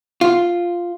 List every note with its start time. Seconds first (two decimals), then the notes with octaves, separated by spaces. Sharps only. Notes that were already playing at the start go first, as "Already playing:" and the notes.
0.21 F4